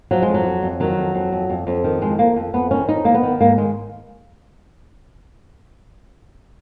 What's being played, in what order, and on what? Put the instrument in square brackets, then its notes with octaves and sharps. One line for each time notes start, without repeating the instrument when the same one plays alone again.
[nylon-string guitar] F3 F#3
G#3
F2
F#3
F2
F2
D#3 F#3
F2
F2
F2
F2
F2
D#3
F2 G#3
F2 A#3
F2
F2 B3
D#3 C#4
F2 D#4
D#3 A#3
B3
D#3
G#2 A#3
D#3 G#3